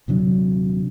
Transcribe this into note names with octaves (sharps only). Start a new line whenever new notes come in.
D#1 C3 F#3 D4